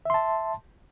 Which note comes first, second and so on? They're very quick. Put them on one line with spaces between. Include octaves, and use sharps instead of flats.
E5 C6 A5